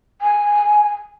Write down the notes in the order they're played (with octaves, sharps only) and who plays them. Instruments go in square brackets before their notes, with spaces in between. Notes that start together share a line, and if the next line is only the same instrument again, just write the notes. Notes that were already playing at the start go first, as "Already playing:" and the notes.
[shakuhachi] G#5